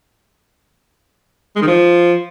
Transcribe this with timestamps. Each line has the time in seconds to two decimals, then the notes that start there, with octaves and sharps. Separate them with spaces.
1.56 G#3
1.61 D#3
1.67 F3